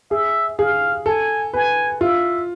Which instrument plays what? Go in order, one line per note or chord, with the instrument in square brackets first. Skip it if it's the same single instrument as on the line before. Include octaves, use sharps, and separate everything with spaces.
[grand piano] G#4 [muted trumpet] E5
[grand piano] G#4 [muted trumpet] F5
[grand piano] A4 [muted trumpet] G#5
[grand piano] B4 [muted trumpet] G#5
[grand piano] F4 [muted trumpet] E5